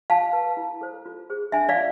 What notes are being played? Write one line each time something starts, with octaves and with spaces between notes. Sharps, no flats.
F4 F5 A5
B4
E4
A4 C5
F4
G#4 C5
D4 E5 G#5
D5 F5
F4